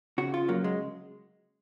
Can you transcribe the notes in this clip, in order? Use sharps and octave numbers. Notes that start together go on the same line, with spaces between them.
C#3 F#4
F4
F#3 A#3
G#3